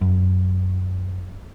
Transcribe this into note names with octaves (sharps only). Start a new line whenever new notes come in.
F#2